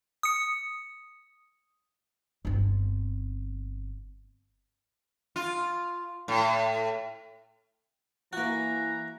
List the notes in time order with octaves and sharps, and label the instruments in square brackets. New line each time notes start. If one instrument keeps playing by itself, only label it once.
[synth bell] D#6 C#7
[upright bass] G1 C4
[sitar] F4
A2
[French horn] E3 [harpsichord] A#3 F#4 [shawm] A#5 [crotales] F#6